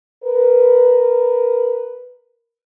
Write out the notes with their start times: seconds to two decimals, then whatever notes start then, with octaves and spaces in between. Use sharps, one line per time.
0.24 A#4 B4